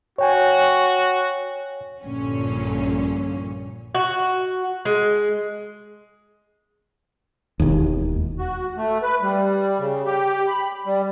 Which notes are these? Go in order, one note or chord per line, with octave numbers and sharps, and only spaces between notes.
F#4 C#5 G5 G#5
A#1 G2 A#2 D3 C#4
F#4
G#3
E1 D#2
F#4
A3
B4
G3
C#3
G4
B5
G3